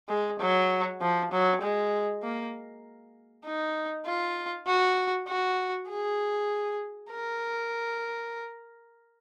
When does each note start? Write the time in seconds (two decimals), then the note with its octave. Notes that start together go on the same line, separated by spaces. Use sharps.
0.09 G#3
0.40 F#3
1.01 F3
1.32 F#3
1.61 G#3
2.23 A#3
3.45 D#4
4.06 F4
4.67 F#4
5.29 F#4
5.90 G#4
7.11 A#4